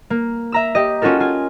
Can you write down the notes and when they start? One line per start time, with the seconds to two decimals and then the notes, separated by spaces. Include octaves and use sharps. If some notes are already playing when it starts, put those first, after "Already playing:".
0.10 A#3
0.52 E5 A#5 E6
0.75 G4 D#5
1.02 C#4 F4 F#4 A4 A#4
1.20 F4 G#5